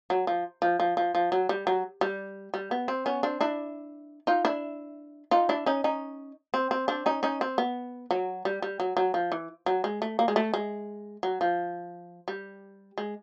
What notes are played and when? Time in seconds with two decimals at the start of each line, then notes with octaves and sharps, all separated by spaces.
0.10 F#3
0.27 F3
0.62 F3
0.80 F3
0.97 F3
1.15 F3
1.32 F#3
1.49 G3
1.67 F#3
2.01 G3
2.54 G3
2.71 B3
2.88 C4
3.06 B3 C#4
3.23 C4 D4
3.41 D4 E4
4.27 D#4 F4
4.45 D4 E4
5.31 D#4 F4
5.49 D4 E4
5.66 C#4 D#4
5.84 C#4 D#4
6.54 C4
6.71 C4
6.88 C4 D4
7.06 C#4 D#4
7.23 C#4 D#4
7.41 C4
7.58 B3
8.11 F#3
8.45 G3
8.62 G3
8.80 F#3
8.97 F#3
9.14 F3
9.32 E3
9.66 F#3
9.84 G#3
10.02 A3
10.19 A#3
10.28 G#3
10.36 A3
10.54 G#3
11.23 F#3
11.41 F3
12.28 G3
12.98 G#3